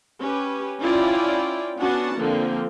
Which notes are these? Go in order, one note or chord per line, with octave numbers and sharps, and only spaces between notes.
C#4 G4 B4
C#4 E4 F4 D5 G5
B3 C#4 D4 F#4 F#5 A5
D3 F3 A#3 C4